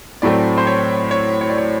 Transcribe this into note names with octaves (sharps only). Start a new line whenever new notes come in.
A2 F#3 A3 C4 D5
C5
C#5
C#5
C#5
D5
C#5